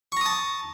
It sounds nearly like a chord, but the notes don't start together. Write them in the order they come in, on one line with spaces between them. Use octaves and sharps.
C#6 A#5 D#6 A5